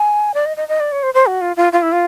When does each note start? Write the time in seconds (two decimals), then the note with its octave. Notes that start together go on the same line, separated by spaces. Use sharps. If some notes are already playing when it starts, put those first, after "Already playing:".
Already playing: G#5
0.34 D5
0.46 D#5
0.57 D#5
0.68 D#5
0.80 D5
0.92 C#5
1.03 C5
1.14 C5
1.26 F#4
1.41 F4
1.56 F4
1.72 F4
1.82 E4
1.92 F4